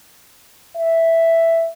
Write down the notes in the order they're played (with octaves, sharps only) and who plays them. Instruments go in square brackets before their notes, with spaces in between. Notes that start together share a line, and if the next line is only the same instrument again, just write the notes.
[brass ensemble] E5